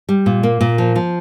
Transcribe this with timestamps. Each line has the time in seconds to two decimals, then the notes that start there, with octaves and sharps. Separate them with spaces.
0.09 G3
0.26 A#2
0.43 A#3
0.61 A#2
0.78 F3
0.96 F3